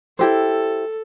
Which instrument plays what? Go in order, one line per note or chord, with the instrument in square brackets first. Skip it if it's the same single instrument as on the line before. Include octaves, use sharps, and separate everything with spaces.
[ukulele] E4 G4 C5 [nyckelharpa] A4